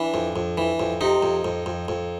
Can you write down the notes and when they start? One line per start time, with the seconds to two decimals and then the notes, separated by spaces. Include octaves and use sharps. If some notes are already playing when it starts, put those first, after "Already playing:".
Already playing: E3 D4
0.14 F2
0.36 F2
0.58 E3
0.80 F2
1.01 C3 D#4
1.23 F2
1.45 F2
1.66 F2
1.88 F2